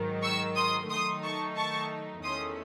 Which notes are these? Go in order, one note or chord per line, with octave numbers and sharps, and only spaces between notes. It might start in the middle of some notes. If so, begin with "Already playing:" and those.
Already playing: G#2 D#3 F#3
C#6 E6
C6 D#6
D#3 F#3 A3 D#4 C6 D#6
A5 C#6
A5 C#6
E2 D#3 A3 C#4 C6 D#6